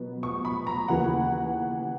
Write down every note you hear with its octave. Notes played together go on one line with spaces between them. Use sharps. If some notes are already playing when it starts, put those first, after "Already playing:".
Already playing: B2 F#3 B3
C#6
B5
A#5
D#2 C#3 E3 F#5